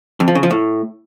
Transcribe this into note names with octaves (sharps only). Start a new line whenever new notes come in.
F2
F3
C#3
F3
A2